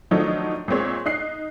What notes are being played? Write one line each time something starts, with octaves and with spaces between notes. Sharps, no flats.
D#3 F3 F#3 A3 D4 D#4
A#2 G#3 C4 C#5
D#4 F#6 C7